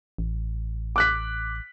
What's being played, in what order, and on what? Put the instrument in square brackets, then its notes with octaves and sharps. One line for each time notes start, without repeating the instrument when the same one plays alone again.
[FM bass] A1
[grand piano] D6 F#6 B6